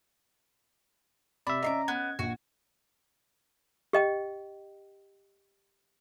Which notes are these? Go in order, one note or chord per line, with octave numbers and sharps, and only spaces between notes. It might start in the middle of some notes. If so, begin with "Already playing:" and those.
C3 D5 E5 B5
C#4 D#5 A#5 C6 D6
B3 G#6
A#1 F#4
G4 D#5 G5